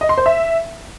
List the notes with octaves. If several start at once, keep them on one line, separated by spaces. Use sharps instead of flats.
D#5
C6
C5
E5